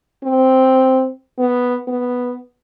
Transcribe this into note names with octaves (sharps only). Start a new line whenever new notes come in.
C4
B3
B3